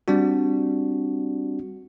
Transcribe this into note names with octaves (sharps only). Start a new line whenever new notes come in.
G3 C4 D4 F#4